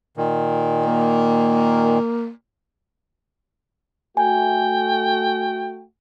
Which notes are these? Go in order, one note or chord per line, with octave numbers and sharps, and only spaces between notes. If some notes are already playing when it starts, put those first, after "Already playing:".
A#2 D#3
A#3
A3 F#4 G5 G#5